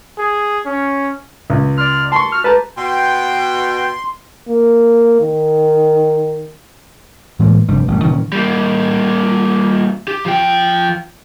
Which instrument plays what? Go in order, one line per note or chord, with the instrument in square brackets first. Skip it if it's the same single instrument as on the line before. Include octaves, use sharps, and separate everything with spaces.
[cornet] G#4
C#4
[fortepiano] C#2
[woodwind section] D5 C6 F6
[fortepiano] A5 C#6 [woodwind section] C6
[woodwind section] F#4 F6
[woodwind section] G4 A4 A5 [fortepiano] B4 A#5
[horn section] B2 G5 [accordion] C6
[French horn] A#3
D#3
[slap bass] A2 E3 G#3 A#3
F1 G2 G3
A1 F#2 G3
A#2 D#3 F#3 C#4
[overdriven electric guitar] G3 A#3
G4
F3 G5